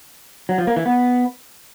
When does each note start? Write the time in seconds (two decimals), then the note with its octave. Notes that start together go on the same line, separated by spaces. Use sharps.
0.49 F#3
0.58 F3
0.67 A#3
0.76 E3
0.86 B3